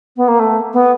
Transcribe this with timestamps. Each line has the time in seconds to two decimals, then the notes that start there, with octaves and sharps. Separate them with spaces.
0.17 B3
0.28 A#3
0.40 A3
0.74 B3